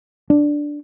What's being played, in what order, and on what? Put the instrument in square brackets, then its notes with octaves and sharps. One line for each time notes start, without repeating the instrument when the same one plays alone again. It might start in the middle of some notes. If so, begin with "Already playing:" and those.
[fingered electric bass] D4